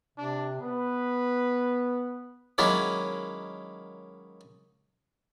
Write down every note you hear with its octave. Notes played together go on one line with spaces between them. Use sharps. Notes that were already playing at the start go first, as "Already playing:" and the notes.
C3 D4
B3 B4
D#3 F#3 G#3 A#3 C#4 E4